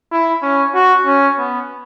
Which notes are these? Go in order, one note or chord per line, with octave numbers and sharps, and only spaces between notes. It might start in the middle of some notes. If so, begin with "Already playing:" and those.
E4
C#4
F#4
C#4
B3